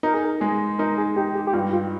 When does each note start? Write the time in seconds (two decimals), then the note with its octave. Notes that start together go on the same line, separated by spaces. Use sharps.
0.03 D#4 A#4
0.14 G#4
0.25 A#4
0.40 G#3 G#4
0.79 D#4 A#4
0.98 G#4
1.16 D#4 G4
1.35 G4
1.47 G4
1.53 G2 F4
1.73 F4